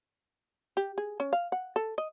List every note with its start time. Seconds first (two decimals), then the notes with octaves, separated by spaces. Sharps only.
0.77 G4
0.98 G#4
1.20 C#4
1.33 F5
1.52 F#5
1.76 A4
1.98 D#5